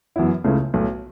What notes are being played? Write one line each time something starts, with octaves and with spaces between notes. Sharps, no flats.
F#2 E3 B3 E4
C#2 C#3 A3 C#4 E4
B1 A2 A3